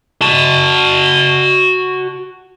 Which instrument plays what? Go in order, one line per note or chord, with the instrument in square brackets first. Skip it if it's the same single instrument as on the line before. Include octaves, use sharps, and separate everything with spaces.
[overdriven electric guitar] F#4 A5